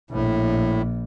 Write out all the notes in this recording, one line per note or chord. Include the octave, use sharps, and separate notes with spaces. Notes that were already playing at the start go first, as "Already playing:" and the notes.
A#1 A2